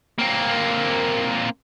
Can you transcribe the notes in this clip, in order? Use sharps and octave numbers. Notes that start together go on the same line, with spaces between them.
A#3 C4